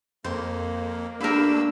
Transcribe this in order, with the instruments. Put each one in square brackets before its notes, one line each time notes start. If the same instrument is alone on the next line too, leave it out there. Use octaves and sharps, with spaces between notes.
[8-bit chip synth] F2 [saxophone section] A#3 [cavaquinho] C5
[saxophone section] A3 G4 [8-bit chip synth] A#3 [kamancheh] D4 E6 [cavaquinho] A#4 B5